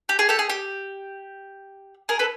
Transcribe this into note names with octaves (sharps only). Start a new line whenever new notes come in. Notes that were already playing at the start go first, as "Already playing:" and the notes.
G4
G#4
G4 A4
G#4
G4
G#4 A#4
A4 B4